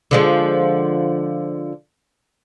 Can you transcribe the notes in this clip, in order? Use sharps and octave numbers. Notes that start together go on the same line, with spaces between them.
D3 F3 G#3